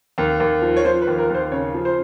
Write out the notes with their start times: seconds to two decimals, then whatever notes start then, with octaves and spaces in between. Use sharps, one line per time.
0.18 D#2
0.40 D#2
0.62 F3
0.76 C#5
0.85 F3 C5
1.02 B4
1.07 D#2
1.18 A#4
1.30 D#2 C5
1.52 C#3 C#5
1.74 F3
1.85 C5